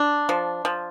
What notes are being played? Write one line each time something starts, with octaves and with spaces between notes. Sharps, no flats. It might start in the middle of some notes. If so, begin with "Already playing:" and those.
Already playing: D4
F3
F3